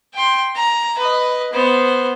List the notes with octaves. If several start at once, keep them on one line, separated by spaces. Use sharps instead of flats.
G5 C6
A#5
B4 D#5
B3 C5